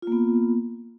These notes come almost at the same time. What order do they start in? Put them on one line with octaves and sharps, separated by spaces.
F4 A#3 B3